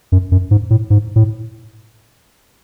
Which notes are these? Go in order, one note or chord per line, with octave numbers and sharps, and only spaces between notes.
F#2
F#2
G#2
A2
G#2
A2